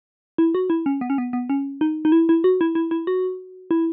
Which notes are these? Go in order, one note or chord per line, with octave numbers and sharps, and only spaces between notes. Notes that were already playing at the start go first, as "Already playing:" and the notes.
E4
F#4
E4
C#4
B3
C#4
B3
B3
C#4
D#4
D#4
E4
E4
F#4
E4
E4
E4
F#4
E4